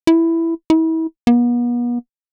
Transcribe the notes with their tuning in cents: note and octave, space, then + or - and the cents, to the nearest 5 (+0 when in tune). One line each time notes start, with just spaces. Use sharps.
E4 +5
E4 -35
B3 -40